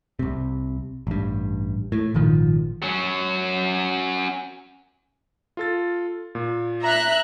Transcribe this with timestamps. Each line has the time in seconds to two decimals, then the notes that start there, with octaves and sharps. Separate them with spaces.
0.19 C2 C3
1.07 A1 G2
1.92 A2
2.14 G#1 A#2 D#3 F3
2.82 F#3 C#4
5.57 F4 A4 A6
6.35 A#2
6.81 E5 A#5 F#6